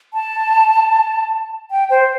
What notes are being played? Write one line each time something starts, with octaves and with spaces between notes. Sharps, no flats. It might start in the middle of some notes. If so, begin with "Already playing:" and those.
A5
G5
C5